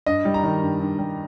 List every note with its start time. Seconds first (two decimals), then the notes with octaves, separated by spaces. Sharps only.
0.06 G2 D#5
0.25 G3
0.34 A#5
0.43 D#3
0.62 G2
0.80 G2
0.98 G3